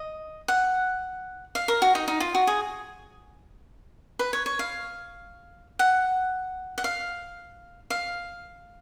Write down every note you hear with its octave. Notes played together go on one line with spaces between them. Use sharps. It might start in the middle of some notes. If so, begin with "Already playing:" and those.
Already playing: D#5
F#5
F5
A#4
F#4
D#4
D#4
F4
F#4
G#4
B4
C#5
C#5
F5
F#5
F#5
F5
F5